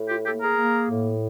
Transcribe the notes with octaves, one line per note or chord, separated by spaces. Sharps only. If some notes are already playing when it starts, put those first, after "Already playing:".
Already playing: A2
F4 G4
A#3 G4 A4
G#4 A#4
A#3
A2